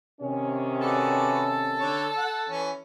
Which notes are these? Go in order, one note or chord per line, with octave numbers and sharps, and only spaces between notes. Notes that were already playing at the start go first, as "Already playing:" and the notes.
C3 D#3 C#4
F#4 A4 B4 D5
D3 C#5
F#5
E3 C#4